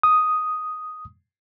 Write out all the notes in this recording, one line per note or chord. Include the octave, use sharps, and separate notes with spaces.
D#6